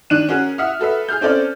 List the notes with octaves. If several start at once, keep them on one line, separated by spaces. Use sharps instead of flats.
D#3 D4 F#6 D#7
C#4 F#4 G#4 A#4
E5 F#5 D#6 F6
F#4 A4 B4 E5
G#4 F6 G6
C4 C#4 A4 D5